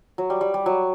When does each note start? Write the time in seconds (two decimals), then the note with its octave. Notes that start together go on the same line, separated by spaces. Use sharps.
0.18 F#3
0.30 G3
0.41 G3
0.54 G3
0.66 F#3